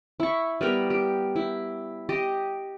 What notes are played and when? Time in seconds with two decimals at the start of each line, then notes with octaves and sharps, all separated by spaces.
0.20 E4 C#6
0.61 G3 B3 A#4 G5
0.90 G4
1.36 E4
2.09 G4 D#5